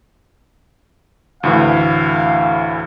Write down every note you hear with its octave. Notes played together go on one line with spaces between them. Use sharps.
D2 A2 E3 F5